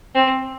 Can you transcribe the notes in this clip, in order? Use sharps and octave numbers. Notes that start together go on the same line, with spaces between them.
C4